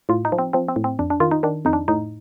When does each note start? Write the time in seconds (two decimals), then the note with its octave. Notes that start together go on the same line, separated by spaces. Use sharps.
0.09 A2 F4
0.25 D#4
0.32 F3
0.39 C4
0.53 F3 C4
0.69 C4
0.76 A2
0.84 C4
0.99 F2 D4
1.10 D4
1.20 D#3 F4
1.31 D#4
1.43 D#3 D4
1.65 F2 D#4
1.73 D4
1.88 A2 D#4